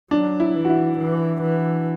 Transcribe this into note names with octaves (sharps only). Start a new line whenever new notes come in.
F#3 D4
E4
E3
F#4
E4
E3
E3